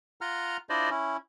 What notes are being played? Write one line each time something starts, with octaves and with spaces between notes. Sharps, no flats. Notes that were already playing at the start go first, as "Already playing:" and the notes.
F4 F#5 A#5 F6
D4 E4 F4 C5 D5 D#5
C#4 E4